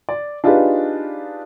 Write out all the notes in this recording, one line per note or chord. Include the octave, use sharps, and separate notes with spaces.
D5
D4 D#4 F4 G4 G#4 B4